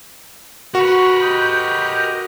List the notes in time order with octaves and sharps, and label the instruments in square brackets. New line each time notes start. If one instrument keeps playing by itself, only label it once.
[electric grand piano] F#4 [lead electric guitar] A#4 B4 [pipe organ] C#6
[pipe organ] G4 D#5 [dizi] G6